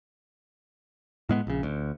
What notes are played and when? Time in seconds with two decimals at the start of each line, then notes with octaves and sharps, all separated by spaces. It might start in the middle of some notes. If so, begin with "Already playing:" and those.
1.29 A2 G#3 B3
1.47 A#1 C#3
1.63 D2